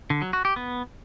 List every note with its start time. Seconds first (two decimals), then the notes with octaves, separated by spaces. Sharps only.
0.10 D3
0.22 F#3
0.33 F#4
0.45 G4
0.56 B3